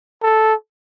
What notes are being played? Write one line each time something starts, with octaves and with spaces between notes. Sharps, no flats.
A4